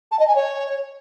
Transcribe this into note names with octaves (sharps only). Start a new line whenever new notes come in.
A5
D#5
G#5
C#5